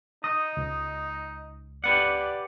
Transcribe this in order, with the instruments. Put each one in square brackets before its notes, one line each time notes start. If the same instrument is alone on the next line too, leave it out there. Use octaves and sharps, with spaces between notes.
[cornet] D#4 [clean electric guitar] D#5 [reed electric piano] D#6
[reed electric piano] C#2
[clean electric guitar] G4 B4 F#5 [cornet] D5